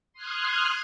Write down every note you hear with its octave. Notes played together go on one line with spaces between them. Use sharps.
C6 D#6 F6 F#6 G#6